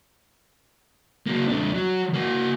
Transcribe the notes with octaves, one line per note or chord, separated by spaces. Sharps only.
F#3 A#3
F2 D4
F#3
A#3 F#4